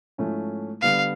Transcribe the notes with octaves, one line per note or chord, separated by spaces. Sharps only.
G#2 F3 A3 C#4 E4
D3 G3 B3 F5